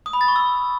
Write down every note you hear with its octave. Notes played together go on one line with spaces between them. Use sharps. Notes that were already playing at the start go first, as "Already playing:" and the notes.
D#6
B5
A6
C#6
E6